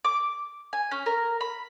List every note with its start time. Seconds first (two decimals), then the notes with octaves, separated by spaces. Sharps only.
0.05 D6
0.73 G#5
0.91 C#4
1.06 A#4
1.41 B5